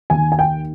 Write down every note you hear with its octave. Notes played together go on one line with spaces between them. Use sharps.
D#2 D#3 G#5
G#5
G5